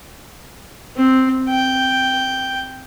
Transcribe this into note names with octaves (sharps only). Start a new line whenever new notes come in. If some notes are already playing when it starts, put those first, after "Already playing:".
C4
G5